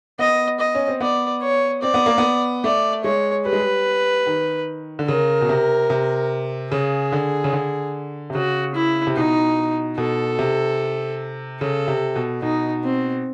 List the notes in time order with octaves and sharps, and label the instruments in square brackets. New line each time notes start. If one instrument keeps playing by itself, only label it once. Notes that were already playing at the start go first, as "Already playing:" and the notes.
[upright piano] B3 [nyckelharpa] D#5
[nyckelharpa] D#5
[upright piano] C#4
C4
[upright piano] B3 [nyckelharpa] D5
[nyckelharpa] C#5
[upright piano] C4 [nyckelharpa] D5
[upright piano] B3
A#3
B3
[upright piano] A3 [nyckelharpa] D5
[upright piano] G#3 [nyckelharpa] C#5
[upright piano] G3 [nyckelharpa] B4
[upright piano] G#3
G3
D#3
D3
[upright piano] C#3 [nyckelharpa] A#4
[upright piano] B2
C3
C3
[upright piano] C#3 [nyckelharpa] G#4
[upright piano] D3
C#3
D3
C3
[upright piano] C#3 [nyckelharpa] F#4
[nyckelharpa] E4
[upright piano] C3
[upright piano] B2 [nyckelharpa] D#4
[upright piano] B2 [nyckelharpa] A4
[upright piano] C3
[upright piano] C#3 [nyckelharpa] A4
[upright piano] C3
B2
[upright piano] B2 [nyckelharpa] D#4
[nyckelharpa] C4